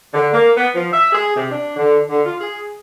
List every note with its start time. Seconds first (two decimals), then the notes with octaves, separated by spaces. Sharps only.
0.13 D3
0.33 A#3
0.57 B3
0.74 F3
0.92 E5
1.12 G#4
1.36 C3
1.51 D4
1.77 D3
2.09 D3
2.26 F4
2.40 G#4